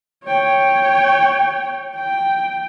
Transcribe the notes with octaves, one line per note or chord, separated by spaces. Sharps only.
C#5 G5
G5